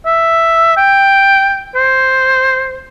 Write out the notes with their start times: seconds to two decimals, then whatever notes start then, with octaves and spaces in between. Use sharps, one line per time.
0.06 E5
0.77 G5
1.75 C5